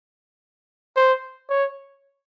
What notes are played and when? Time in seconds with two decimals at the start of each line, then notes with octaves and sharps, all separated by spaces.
0.96 C5
1.49 C#5